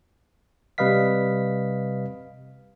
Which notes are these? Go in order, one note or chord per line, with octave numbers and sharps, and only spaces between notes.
C3 G3 B4 D#5 F5 B6